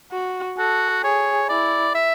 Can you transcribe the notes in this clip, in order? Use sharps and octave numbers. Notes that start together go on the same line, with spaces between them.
F#4
F#4 A4
G#4 C#5
E4 D5
E5